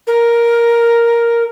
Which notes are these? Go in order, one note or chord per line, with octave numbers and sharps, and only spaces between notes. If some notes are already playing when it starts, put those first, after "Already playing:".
A#4